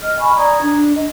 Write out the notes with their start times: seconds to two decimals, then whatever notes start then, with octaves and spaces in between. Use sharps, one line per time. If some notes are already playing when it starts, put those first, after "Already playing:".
0.01 D#5 F6
0.20 G#5 B5 C#6
0.36 D5 A#5 D#6 G#6
0.62 D4
0.95 D#5